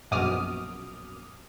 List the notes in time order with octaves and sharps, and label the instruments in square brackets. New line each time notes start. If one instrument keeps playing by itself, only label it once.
[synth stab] A#1 F#2 B2 D6 D#6 F6